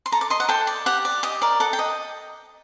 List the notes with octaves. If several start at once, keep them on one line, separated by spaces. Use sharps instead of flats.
C6
A4 A#5
D6
D#5 C6
F#5
A4 G5
D5
G4 F#5
D5
G4 D#5
A#4 D5
A4 F#5
G5
D#5